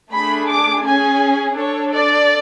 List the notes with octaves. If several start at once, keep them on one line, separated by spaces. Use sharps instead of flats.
A3 D4 G#4 B5
D6
C#4 G#4 G#5
D4 A4 C#5
D5